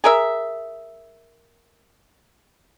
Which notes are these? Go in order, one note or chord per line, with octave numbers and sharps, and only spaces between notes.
G#4 A#4 E5